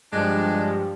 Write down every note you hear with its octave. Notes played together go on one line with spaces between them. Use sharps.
G2 F3 G3 G#3 D4